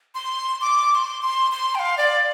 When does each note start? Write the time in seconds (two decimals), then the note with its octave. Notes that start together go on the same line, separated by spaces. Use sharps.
0.15 C6
0.61 D6
0.91 D6
0.95 C6
1.22 C6
1.52 C6
1.75 G5
1.79 F5
1.98 D5